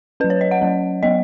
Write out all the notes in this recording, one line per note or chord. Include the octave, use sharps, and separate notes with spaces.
F#3 C#4 B4
C#5
D#5
F#5
F#3 C#4
F#3 B3 D#5